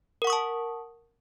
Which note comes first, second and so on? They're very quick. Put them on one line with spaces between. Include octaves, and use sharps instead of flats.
A#4 F#5 C#6 D#6 A5